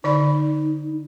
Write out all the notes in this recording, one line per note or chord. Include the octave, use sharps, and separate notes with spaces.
D3 D#4 D5 B5